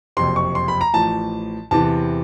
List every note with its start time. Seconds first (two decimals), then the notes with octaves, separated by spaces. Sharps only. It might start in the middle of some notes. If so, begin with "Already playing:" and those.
0.17 F#1 F2 C3 C6
0.36 C#6
0.55 C6
0.68 B5
0.81 A#5
0.94 A1 A2 F3 A5
1.71 E2 C3 E3 A5